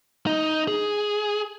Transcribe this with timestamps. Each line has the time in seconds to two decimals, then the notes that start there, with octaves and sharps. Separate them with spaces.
0.27 D#4
0.68 G#4